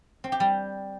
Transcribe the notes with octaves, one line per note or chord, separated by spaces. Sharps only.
C4
G4
G3